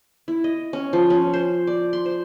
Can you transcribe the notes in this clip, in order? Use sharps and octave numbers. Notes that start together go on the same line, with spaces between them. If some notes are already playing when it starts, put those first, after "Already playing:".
E4
D#5
C#4
F3
C#4
C5
D5
C6
C5